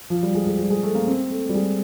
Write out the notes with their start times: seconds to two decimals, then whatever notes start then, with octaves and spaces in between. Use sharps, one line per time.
0.10 F3
0.23 G3
0.35 G#3
0.47 G#3
0.59 G3
0.70 G#3
0.83 A3
0.95 A#3
1.07 C4
1.30 A3
1.49 G3
1.55 G#3